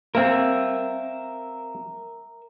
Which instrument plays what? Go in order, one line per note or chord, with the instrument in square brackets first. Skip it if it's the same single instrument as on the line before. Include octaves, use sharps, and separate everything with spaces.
[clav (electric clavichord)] A#3 C4 [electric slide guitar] A#4 E5